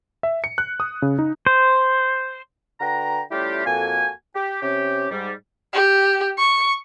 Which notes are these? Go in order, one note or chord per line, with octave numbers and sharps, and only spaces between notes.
E5
C#7
F#6
D#6
C#3
D#4
C5
D3 F#4 B4 G5 A#5
G3 A3 C#4 E4 F4 G4
F2 A#3 F#4 A4 G#5
G4
C3 C#4 G4
G#2 G3
G4
C#6